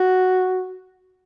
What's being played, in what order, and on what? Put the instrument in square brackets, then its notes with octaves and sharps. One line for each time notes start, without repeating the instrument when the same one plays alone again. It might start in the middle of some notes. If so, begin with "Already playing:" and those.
Already playing: [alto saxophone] F#4